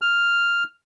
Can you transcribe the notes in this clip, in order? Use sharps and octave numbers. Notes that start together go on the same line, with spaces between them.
F6